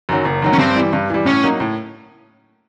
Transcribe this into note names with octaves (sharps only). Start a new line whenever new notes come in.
F#2 D#3 F#3
F#1
F#2 D#3 F#3
C#4
G2 C4
E3 G3
G2
E3 G3
A2 C#4
F#3 A#3 D#4
A2